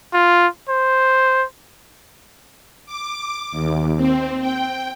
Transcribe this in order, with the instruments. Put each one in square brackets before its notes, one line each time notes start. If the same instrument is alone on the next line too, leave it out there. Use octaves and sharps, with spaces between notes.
[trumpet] F4
C5
[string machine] D6
D#2
C4
G5